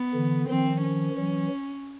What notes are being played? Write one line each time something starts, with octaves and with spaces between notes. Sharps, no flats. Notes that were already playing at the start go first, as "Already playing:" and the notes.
Already playing: B3
D3 E3
D#3 F3 C4
C#4
E3 F#3